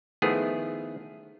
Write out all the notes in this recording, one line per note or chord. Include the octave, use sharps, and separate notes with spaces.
D#3 F3 A3 B3 E4 G#4